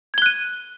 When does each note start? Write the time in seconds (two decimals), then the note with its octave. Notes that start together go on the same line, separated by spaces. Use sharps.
0.14 G#6
0.18 G7
0.22 F#6
0.26 D#7